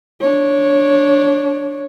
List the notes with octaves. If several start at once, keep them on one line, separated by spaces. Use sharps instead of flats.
D4 C#5